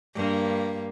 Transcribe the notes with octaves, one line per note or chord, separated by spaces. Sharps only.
G2 A#3